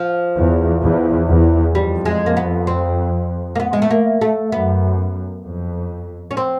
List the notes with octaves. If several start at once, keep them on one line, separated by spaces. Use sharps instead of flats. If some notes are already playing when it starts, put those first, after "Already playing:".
Already playing: F3
E2
E2
E2
F2 G3
G#3
A#3
B3
C4
A#3
B3
G#3
A3
A#3
A3
F#2 B3
F2
C#4
C4